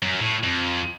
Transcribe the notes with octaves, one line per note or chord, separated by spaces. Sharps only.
F#2
A2
F2